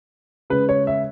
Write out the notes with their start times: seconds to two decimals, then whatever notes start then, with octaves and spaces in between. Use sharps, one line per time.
0.50 C#3 G#3 B4
0.69 C#5
0.87 E5